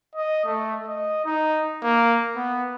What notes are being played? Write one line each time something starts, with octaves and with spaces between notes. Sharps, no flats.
D#5
A3
D#5
D#4
A#3
B3